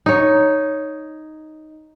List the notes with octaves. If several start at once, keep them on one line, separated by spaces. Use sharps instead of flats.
D#4 C#5